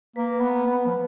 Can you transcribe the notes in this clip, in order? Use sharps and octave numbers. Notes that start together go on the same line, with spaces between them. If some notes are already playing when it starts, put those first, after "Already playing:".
A#3 B4
B3
B3
F3